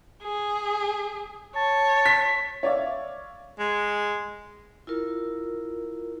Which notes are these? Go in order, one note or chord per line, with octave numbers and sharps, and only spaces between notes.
G#4
C#5 A5
B6
C#5 D5 E5 F5
G#3
E4 F4 A#4